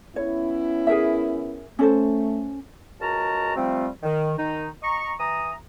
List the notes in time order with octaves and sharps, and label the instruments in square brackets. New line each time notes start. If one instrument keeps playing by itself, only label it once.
[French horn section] B3 C#4 E4 [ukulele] C#5
[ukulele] G#4 A#4 E5
[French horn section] A3 [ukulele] C#4 A4 C5
[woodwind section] C#2 G#3 F#4 A#4 A5 A#5
C3 F3 G3 A3 C4
D#3
D#3 D#4
D#5 A#5 C#6
E3 A#5 D#6